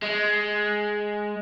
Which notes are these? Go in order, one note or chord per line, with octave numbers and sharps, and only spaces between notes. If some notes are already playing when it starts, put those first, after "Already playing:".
G#3